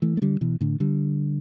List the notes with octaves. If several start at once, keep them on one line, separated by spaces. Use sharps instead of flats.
E3 A3
A3
D3 G3
B2 E3
A2 D3
D3 G3